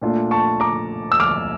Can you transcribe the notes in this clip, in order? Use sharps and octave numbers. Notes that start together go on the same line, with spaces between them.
A#2 A3 D4 F4
A5 C#6
A#5 D6
E6
D6 F6